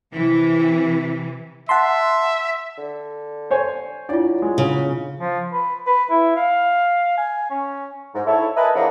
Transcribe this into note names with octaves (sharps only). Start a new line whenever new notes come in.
C3 E3
E5 F#5 A5 C6
D3
C5 C#5 G#5
F#3 D4 E4 F4 D5
G#3
C#3
F3
B4
B4
E4
F5
G#5
C#4
G#2
E4 A4 C#5
A#4 B4 D#5 E5 G#5 A5
C#3 E3 F3 B3 D4 A#4